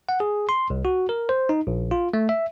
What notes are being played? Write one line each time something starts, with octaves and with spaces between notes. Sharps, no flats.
F#5
G#4
C6
C2
F#4
A#4
C5
D#4
A#1
F4
A3
E5